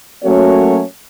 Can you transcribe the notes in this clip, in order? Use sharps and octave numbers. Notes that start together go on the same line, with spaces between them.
F#3 A3 A#3 C#4 F#4 C#5